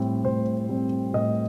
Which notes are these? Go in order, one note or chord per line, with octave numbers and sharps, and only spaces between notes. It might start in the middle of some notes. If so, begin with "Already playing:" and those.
Already playing: A2 G3 C4
A2 C5
G3 C4
A2 D#5